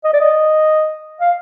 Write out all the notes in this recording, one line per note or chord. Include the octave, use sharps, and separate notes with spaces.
D#5
D5
D#5
F5